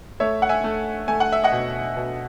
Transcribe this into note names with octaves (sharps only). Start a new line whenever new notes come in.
A3 C#5 E5
F#5
E5 G#5
A3
A3 G#5
F#5
E5
D#5 F#5
B2
B2